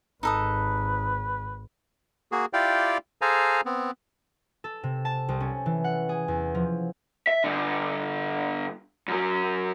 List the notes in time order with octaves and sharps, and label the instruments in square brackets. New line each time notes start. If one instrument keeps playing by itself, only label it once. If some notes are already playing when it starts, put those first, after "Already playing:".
[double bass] G#1 [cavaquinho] D#4 A4 D#6 [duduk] B4
[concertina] A#3 F#4 G#4
E4 F4 G4 D5 F5 G5
G#4 A4 C5 F5 G#5 A#5
B3 C4
[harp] A4
C3
A5
C2
C#4
E3
F#5
G#4
E2
F3
[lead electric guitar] E5
G2 D3
F#2 F#3